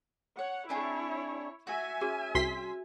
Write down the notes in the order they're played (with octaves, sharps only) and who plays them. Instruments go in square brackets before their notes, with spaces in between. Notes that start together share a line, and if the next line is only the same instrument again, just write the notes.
[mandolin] C#5 [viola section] F#5
[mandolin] C4 D4 G#4 [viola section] E4 C#5
[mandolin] F#4 [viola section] E5 G#5
[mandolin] C#4 [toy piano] F#4 G#4
[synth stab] C2 C6 B6 [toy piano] F#4